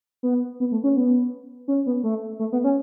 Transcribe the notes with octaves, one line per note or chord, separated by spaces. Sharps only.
B3
B3
A3
C#4
B3
C#4
B3
A3
A3
B3
C#4